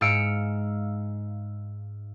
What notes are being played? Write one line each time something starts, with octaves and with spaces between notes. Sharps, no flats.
G#2 F5 E6 C#7 D7